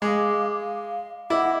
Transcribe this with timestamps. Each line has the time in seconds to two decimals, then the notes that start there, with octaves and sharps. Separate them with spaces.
0.02 G#3 F5 D6
0.55 F5
1.30 E4 D#5 F#5 D6